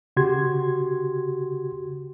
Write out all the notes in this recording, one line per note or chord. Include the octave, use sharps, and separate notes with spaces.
C#3 F#4 G4 C6 G#6